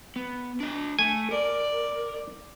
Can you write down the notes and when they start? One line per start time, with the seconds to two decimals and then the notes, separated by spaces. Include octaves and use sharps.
0.16 B3
0.60 D4 D#5
0.99 A3 G#5
1.31 A#4 D5